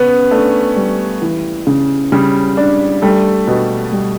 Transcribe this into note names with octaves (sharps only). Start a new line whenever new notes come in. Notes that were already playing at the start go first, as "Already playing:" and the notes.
Already playing: C#3 B3 C#4
A3 D4
G3
E3
C#3
C#3 G3
D4
G3 A3
B2
G3